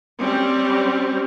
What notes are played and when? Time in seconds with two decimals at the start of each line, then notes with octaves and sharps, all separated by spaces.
0.20 G3 C4 C#4 G4